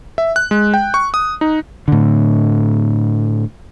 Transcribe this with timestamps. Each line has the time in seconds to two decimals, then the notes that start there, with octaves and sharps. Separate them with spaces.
0.18 E5
0.36 F#6
0.51 G#3
0.74 G5
0.94 C#6
1.14 D#6
1.41 D#4
1.88 A2 D3